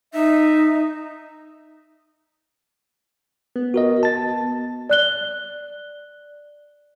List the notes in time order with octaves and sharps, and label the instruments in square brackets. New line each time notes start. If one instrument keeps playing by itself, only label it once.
[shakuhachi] D#4 [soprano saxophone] E5
[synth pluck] B3
[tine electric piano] F#4 A#4 D#5
A5 A6
[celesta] D5 F#6 G7